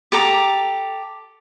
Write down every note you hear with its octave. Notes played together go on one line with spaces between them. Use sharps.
G4 A4 A#5 D6